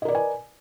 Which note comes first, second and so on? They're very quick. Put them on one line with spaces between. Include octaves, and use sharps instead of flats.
D#5 A#4 D5 B4 G#5